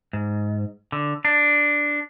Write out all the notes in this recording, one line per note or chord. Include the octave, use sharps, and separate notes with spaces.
G#2
D3
D4